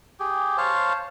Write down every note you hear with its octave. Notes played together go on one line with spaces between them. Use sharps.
G4 G#4
C5 C#5 F5 A5